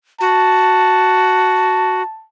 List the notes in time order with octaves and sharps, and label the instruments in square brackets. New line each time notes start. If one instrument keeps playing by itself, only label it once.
[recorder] F#4 [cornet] A5